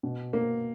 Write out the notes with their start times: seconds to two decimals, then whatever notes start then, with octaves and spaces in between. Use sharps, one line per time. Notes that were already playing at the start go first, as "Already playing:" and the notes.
0.03 B2
0.33 A#3